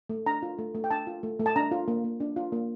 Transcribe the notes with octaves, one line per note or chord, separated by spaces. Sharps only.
A3
D4 A#5
F4
A3
A3
G5
D4 A5
F4
A3
A3
A5
D4 A#5
F4
A#3
A#3
D4
F4
A#3